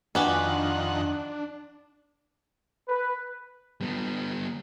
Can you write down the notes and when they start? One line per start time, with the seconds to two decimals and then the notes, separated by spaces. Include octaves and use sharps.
0.15 F2 D#3 D4 F#4 G4 B4 F#5 G#5
2.88 B4
3.81 G3 B3